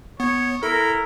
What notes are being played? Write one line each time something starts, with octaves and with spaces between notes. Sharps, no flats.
B3 C#5
E4 A4 A#4